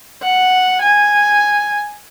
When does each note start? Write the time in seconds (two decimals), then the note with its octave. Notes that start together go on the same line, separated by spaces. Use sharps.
0.23 F#5
0.82 G#5